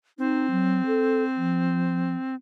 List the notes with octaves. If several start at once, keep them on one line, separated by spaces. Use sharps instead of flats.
C4 D#4
F#3
A4
F3